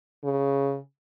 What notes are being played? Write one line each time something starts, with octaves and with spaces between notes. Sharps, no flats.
C#3